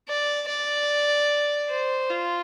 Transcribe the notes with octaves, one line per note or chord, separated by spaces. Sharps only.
D5
D5
C5
F4